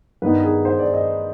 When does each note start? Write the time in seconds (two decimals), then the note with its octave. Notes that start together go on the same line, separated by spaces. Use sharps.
0.22 G2 D#3 B3 D#4 B4
0.43 G#4
0.65 C5
0.79 D5
0.94 D#5